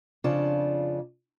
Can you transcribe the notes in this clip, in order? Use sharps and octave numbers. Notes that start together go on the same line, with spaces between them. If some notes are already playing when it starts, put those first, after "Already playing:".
F2 C#3 D4 F4 D5 A5